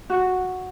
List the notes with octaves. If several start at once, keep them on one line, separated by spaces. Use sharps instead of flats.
F#4